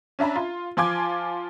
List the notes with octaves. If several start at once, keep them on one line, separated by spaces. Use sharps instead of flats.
C#4 D4 E5 A#5 B5
F4
F3 F4 G#5 D6 G#6